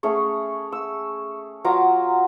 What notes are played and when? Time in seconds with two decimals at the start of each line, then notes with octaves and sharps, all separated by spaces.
0.03 A3 C#4 G#4 C#5
0.72 E6
1.65 F#3 F4 A#5 D6